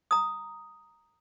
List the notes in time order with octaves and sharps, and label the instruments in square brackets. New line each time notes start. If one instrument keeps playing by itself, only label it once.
[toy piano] A#5 D#6